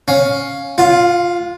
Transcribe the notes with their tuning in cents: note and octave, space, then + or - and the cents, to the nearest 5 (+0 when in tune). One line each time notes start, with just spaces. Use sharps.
C#4 +0 F5 +10
F4 +0 F5 +45